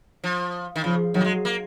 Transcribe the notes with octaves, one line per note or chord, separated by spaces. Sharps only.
F3
D#3
C#3 F3
D#3 F#3
A#3
G#3
A#3